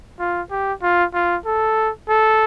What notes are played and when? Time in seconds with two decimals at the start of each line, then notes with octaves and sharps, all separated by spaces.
0.19 F4
0.51 G4
0.82 F4
1.14 F4
1.46 A4
2.09 A4